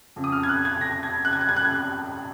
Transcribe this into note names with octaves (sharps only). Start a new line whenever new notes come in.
F2 C#3
D#6
F6
G#6
F#6
G#6
A#6
G#6
F#6
G#6
F#6
G#6
F#6
G#6